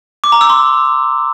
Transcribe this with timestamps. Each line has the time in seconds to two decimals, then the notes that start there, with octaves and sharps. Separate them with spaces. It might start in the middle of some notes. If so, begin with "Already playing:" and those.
0.24 D6
0.32 A#5
0.41 E6
0.50 C6